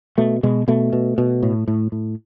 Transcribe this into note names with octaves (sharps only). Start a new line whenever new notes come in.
B2 A3
B2 G#3
B2 A3
B2
B2
A2
A2
A2